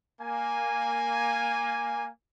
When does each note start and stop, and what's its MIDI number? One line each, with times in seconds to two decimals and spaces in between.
0.22 2.09 58
0.22 2.09 80